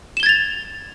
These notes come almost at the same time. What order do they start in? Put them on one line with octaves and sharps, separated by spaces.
E7 G7 G#6 A6 F7